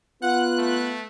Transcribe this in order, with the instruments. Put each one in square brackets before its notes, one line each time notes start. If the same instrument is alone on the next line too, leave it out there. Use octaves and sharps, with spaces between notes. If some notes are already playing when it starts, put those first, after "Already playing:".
[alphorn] B3 [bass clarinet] F4 [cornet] F#5 [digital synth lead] F#6
[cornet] A3